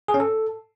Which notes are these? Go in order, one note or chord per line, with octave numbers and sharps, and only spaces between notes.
G#4
C#4
A4